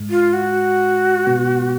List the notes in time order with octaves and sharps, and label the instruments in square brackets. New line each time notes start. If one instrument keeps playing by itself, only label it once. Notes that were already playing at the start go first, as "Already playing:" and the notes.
Already playing: [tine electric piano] G#2 G#3
[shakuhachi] F4
F#4
[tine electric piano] B2 B3